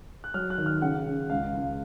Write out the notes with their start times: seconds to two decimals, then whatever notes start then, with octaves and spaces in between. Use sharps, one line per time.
0.24 F#6
0.34 F#3 F6
0.50 F#6
0.58 D#3
0.66 F6
0.82 C#3 F#5
1.06 C#3
1.30 C#2 F5
1.54 C#2